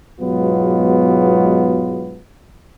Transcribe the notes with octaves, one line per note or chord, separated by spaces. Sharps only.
G#2 B2 F#3 G#3 B3 F4